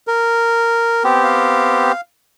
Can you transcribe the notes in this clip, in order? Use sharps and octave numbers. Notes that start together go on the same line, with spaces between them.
A#4
B3 C4 G4
F5